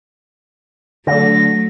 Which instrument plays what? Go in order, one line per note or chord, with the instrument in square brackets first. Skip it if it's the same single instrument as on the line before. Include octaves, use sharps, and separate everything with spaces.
[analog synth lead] D3 [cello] F#3 A3 [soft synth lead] A#6